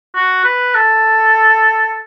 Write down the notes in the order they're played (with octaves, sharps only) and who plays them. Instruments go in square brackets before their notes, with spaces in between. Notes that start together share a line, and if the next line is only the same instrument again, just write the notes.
[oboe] F#4
B4
A4